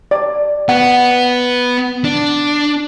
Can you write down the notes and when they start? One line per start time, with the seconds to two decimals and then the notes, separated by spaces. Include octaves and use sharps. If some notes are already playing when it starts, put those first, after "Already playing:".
0.11 D5
0.69 B3 F#5
2.05 D4